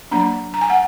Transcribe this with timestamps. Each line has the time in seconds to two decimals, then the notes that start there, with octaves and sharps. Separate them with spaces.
0.11 F#3 A#3 D4 A#5
0.54 A#5
0.61 G#5
0.70 F#5